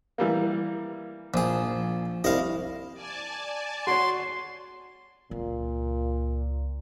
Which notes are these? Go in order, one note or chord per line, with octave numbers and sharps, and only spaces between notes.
E3 G3 A#3
A#1 F3 G#4
C2 E4 D#5 F5
D5 G#5 A5
F#4 C#5 C6
C#2 A#2